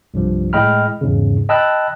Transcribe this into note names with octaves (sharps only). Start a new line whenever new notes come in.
C2 G2 F3
A2 G#3 D#5 G5 B5 F6
E2 G#2 C#3
D#5 G5 A5 B5 E6 F#6